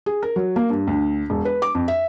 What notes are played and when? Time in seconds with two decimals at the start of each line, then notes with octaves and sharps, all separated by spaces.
0.06 G#4
0.23 A#4
0.36 F#3
0.56 A#3
0.70 G2
0.87 D2
1.30 E1
1.45 B4
1.62 D6
1.75 F2
1.88 E5